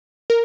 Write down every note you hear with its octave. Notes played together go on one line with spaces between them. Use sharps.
A#4